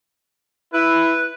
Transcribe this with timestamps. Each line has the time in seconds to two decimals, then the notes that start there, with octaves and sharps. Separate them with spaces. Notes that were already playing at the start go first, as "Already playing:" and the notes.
0.73 E4 B4